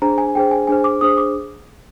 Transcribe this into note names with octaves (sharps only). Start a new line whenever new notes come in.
D4 G#4 C5 A#5
G#5
D4 G#4 C5 G5
G#5
D4 G#4 C5 G#5
D6
D4 G#4 C5 D#6
D6